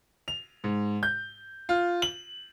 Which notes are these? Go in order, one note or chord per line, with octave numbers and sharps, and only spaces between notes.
F7
G#2
G6
F4
F#7